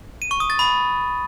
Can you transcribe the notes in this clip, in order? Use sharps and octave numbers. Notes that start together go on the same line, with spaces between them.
D#7
C#6
D#6
A6
B5